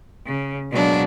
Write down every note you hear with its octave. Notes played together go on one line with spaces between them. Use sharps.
C#3
B2 F#3 G#3 A#3 D4